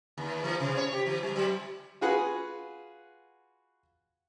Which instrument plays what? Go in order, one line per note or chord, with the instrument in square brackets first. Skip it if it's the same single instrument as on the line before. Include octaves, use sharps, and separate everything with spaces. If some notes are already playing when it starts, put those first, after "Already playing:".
[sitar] D#2
E3
C3
C#5
G4
E3
G3
F#3
[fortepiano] F4 F#4 G#4 B4 F#5